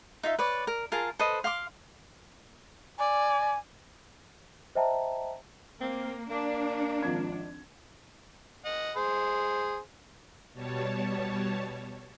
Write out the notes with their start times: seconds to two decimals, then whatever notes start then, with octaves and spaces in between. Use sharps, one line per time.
0.23 D#4 F4 E5
0.39 B4 C#5 D5
0.67 A#4
0.92 F4 G#4 A#4 A5
1.19 A4 B4 C5 D#5
1.44 F5 C6 D6
2.99 D5 G#5
4.75 C5 D#5 E5 G5 A5 A#5
5.80 A#3 C4
6.30 A#3 D4
7.02 G#1 F3 G#6
8.65 D#5 F#5
8.96 G#4 C5
10.53 B2 G3 C#5 A5